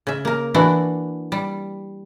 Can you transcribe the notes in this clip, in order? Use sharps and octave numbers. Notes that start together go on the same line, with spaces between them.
C#3 E5
A#3 A#4
E3 D4 E4 F#4
G3